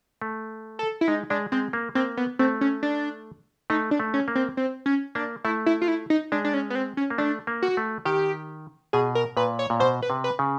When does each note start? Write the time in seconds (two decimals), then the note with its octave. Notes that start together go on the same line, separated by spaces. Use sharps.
0.22 A3
0.79 A4
1.01 E4
1.08 G#3 D#4
1.30 G#3 D4
1.52 G#3 C4
1.73 A#3
1.95 A#3 C4
2.17 B3
2.39 A3 C4
2.61 C#4
2.83 D4
3.70 A3 D#4
3.91 D4
4.00 A3
4.14 C#4
4.28 A#3
4.35 C4
4.57 C4
4.86 C#4
5.15 A#3 D4
5.44 A3 E4
5.66 E4
5.82 F4
5.88 E4
6.10 D#4
6.32 G#3 D4
6.44 D4
6.54 C#4
6.70 B3
6.75 C4
6.97 C#4
7.10 A#3
7.18 A3 D4
7.47 A#3
7.62 F#4
7.77 A3
8.05 D#3 G4
8.93 B2 G#4
9.15 A#4
9.37 A#2 B4
9.59 C#5
9.70 A#2
9.80 B2 C5
10.02 B4
10.10 C3
10.24 B4
10.39 C#3